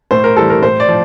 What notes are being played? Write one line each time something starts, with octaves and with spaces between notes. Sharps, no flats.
A2 C5
A#4
E3 G3 A4
A#4
A2 C5
D5
F3